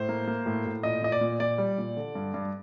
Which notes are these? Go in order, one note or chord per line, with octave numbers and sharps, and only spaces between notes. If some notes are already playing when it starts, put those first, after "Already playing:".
Already playing: A2 C5
A#3
A#3
A2
A2
A#2 D#5
A#2 D#5
D5
A#2
A#2 D5
G3
A#2
D3
G2
G2